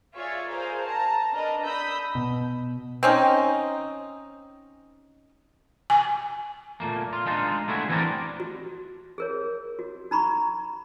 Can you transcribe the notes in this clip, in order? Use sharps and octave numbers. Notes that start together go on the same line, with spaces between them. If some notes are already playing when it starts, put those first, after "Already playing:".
F4 G#4 C#5 D5 E5
G#4 A#4 C5 F5
A5 A#5
D4 A#4 B4 D#5
A#5 B5 D#6 E6 G6 B6
B2
C4 C#4 D#4
G#5
A#2 A3 A#3
F4
G#3 D4 D#4 F4
A3 D4 E4 F#4 G#4
E3 B3 C4 D4 A#4 D5
F#4
G#4 A#4 C#5
F#4
D#4 A#5 B5 C#6